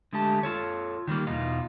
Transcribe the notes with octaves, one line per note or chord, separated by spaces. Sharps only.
D3 G#3 A3 G4 A5
F4 A4 C#5
D#3 F#3 G3 A#3
E2 B2 E3 D#4 F4